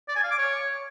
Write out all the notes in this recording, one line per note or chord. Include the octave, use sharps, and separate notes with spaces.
D5
G#5
F5
D6
C#5